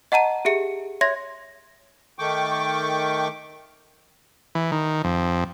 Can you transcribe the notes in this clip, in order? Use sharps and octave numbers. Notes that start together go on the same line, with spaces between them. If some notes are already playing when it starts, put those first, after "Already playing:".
D#5 F#5 A5 A#5 D#7
G4 G#4 E5 C#7
C#5 E5 C6 G#6 A#6
D#3 A3 G5 C#6 D6
E3
D#3
F2